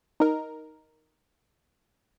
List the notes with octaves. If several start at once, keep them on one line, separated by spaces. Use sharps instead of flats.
D#4 A#4